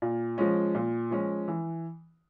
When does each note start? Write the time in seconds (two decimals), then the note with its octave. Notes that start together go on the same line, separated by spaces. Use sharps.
0.02 A#2
0.38 F3 G#3 C#4
0.75 A#2
1.11 F3 G#3 C#4
1.48 E3